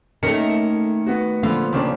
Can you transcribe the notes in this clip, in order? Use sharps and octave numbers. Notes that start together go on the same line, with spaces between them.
D#3 A3 A#3 C#4 C#7
B3 F#4
A#2 D3 F3 B3 F4
D#2 C#3 A#3 D4